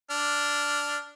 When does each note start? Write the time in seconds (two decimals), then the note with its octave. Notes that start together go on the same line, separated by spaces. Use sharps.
0.10 D4 F6